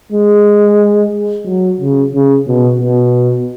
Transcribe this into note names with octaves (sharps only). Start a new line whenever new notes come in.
G#3
F#3
C#3
C#3
B2
B2